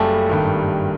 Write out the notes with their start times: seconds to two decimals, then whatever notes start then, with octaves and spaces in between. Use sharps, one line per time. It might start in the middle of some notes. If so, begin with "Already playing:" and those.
Already playing: F#1 F#2 C#3 G3 A3
0.29 G#1 G2 D#3